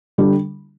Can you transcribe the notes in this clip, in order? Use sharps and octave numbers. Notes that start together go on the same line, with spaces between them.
D3 G3